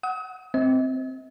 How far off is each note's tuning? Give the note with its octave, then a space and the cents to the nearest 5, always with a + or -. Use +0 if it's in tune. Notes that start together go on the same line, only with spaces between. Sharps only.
F#5 +0 D#6 +40
C4 +0 D#5 +40